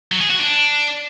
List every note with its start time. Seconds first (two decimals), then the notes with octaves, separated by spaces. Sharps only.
0.11 F#3
0.21 G#4
0.30 F#4
0.39 D4